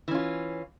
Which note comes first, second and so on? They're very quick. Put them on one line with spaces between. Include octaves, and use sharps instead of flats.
E3 C#4 F4